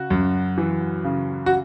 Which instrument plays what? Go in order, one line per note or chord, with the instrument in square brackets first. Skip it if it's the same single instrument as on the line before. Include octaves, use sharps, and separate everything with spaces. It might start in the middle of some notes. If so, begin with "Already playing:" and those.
Already playing: [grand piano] C#3 F#4
F#2
E3
C#3
F#4